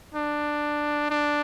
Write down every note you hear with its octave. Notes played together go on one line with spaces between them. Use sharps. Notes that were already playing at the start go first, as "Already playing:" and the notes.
D4
D4